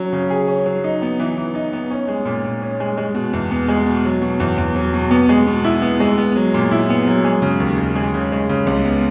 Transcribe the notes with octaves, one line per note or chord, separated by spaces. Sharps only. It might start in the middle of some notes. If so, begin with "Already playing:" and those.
Already playing: F#3 C#4
C#3
G#4
C#4
F#3
D#4
B3
E3
E3
D#4
B3
C#4
G#3
A#2
A#2
C#4
G#3
G#3
B2
E2
B3
G#3
B2
F#3
B2
E2
E2
F#3
B2
B3
G#3
B2
E4
B3
G#3
B3
F#3
A#2
E4
B3
F#3
G#3
C#3
D#2
D#2
G#3
C#3
G#3
C#3
C#2
B3